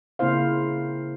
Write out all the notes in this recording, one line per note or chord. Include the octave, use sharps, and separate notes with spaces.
C#3 A#3 C4 E4 C5 F5